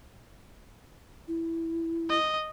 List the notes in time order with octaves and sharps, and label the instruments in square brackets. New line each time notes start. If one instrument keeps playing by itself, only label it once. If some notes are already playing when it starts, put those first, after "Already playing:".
[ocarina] E4
[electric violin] D#5